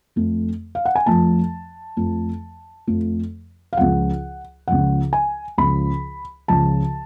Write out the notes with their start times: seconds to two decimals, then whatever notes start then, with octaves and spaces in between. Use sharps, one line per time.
0.16 F2 F3 A3
0.75 F5
0.85 F#5
0.95 G#5
1.06 F2 F3 A3 A5
1.97 F2 F3 A3
2.87 F2 F3 A3
3.73 F5
3.77 C#2 C#3 F3 F#5
4.68 C#2 C#3 F3 F#5
5.13 G#5
5.58 C#2 C#3 F3 B5
6.48 C#2 C#3 F3 A5